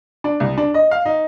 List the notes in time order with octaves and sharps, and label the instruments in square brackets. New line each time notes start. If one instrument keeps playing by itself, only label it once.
[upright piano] D4
C2
D4
D#5
F5
D#4